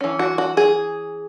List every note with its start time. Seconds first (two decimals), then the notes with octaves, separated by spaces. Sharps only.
0.01 E3 C#4
0.19 F#4
0.38 F#4
0.57 G#4